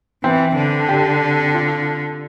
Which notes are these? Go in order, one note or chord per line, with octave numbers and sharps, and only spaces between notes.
E3 C4
D3
G4
F4